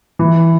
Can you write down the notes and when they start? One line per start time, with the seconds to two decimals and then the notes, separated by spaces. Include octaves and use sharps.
0.19 E3